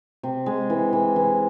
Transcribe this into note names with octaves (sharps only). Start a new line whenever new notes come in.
C3
G#3
E3
E3
E3